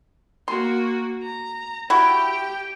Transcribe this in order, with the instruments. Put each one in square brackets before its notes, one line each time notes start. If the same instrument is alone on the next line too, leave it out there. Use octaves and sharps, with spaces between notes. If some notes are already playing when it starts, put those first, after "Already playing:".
[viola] A#3 F#4 [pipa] C6
[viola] A#5
[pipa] E4 F#4 [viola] G4 G5